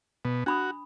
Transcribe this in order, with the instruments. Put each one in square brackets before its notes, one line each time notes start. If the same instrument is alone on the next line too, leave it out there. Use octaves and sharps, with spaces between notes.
[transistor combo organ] B2
[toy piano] D4 B5 D#6 [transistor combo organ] F#4